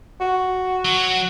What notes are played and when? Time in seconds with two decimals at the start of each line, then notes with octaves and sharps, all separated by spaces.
0.20 F#4
0.85 F#3